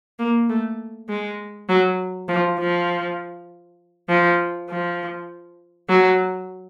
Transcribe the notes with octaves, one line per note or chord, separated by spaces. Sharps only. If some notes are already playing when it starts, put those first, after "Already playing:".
A#3
A3
G#3
F#3
F3
F3
F3
F3
F#3